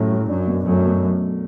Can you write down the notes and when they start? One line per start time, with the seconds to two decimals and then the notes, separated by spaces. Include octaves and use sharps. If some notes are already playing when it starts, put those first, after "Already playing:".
Already playing: F#2 A2 F#3 C#4 G4
0.11 F#3
0.29 F#2 D4
0.47 B2
0.66 F#2 A3
0.85 B2